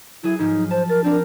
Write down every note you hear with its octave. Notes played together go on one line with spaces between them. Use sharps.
F#3 E4 G#4
G#2 F3 D#4
C5 A5
A#4 A6
C4 D4 A#4